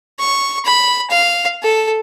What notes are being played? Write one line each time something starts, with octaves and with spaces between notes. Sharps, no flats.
C#6
B5
F5
A4